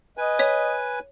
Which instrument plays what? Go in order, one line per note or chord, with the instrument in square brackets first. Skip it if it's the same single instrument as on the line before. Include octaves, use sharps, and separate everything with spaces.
[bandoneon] B4 G#5 [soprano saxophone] D#5
[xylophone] C#5 B6